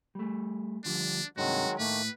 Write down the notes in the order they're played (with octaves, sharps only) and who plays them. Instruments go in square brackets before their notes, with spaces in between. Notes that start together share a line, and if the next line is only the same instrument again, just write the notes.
[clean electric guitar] G3 A3
[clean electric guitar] D2 F3 G3 [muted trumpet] D4
[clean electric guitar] G2 C3 [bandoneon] D#3 F#3 G#3 [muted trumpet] F#4
[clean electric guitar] A2 [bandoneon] D#3 A3 A#3 [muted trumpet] B4